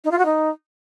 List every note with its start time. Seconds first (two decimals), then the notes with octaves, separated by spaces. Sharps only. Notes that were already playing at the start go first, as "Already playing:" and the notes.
0.04 D#4
0.11 F4
0.18 F#4
0.25 D#4